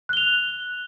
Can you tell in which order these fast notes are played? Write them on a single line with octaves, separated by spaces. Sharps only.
F#6 G7 F7